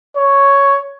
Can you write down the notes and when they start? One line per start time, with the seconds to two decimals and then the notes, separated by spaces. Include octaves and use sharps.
0.17 C#5